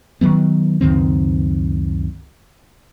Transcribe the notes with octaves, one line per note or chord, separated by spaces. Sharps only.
D#3 E3 F#3 B3
C#2 F#2 D#3 C4